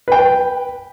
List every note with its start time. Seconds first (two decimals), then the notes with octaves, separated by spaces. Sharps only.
0.08 B4 G5